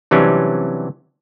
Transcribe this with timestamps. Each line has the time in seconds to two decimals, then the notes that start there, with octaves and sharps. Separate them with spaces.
0.11 C3 E3 F#3 G3 C#4 D4